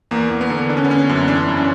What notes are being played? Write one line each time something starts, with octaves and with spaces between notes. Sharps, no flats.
E2 A#3
E2
B3
D3
D3 D4
C#4
B3
D3 C#4
F#2
E3 D4
G2
C#4